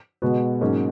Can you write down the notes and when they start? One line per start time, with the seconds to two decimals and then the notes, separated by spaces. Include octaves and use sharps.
0.22 B2 G#3 B3 F#4
0.61 G#2 F#3 A#3 C#4 G#4